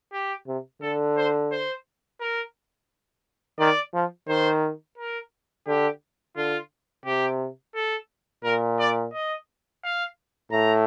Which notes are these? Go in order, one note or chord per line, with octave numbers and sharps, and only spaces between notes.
G4
C3
D3 A4
C5
C5
A#4
D#3 D5
F3
D#3 C5
A#4
D3 G4
D3 F4
C3 G4
A4
A#2 A#4
D5
D#5
F5
A2 A#5